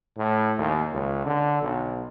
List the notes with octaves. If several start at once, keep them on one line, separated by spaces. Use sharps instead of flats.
A2
D#2
C#2
D3
B1